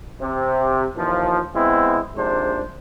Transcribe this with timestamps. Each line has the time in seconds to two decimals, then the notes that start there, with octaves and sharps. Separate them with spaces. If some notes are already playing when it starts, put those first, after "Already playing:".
0.20 C3
0.96 D#2 E3 F3
1.54 G#3 B3 C4 E4
2.15 A#1 G#2 C3 D4 C5